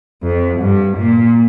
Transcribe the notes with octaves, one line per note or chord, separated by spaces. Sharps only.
F2
G2
A#2